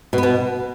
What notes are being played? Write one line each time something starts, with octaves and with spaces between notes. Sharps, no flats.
B2
B3
B2